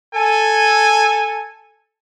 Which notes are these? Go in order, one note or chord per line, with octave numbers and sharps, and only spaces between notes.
A4 G#5